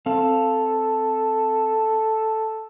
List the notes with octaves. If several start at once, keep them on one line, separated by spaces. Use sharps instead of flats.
C4 A4 F5